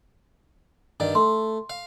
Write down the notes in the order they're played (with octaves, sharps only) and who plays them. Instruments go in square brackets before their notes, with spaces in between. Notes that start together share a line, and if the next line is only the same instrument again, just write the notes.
[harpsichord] G2 D#3 D5
[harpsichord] A3 [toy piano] C6
[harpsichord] F5